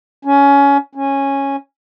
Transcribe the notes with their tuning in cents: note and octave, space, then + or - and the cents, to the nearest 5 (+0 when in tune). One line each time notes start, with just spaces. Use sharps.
C#4 +20
C#4 -10